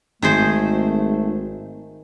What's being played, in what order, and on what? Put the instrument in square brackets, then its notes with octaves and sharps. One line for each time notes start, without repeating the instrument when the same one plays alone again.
[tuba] G#1 [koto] D#3 G#4 C5 [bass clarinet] A3